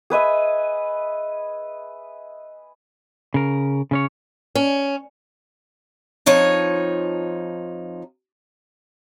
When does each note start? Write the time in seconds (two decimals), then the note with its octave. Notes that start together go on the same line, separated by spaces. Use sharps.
0.10 G#4 B4 D#5 E5
3.34 C#3 A#4
3.91 C#3 C#4 C#5
4.55 C#4
6.26 F2 F3 D#4 C#5